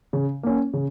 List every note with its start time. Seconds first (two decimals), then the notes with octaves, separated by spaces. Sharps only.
0.13 C#3
0.43 A#3 C#4
0.73 C#3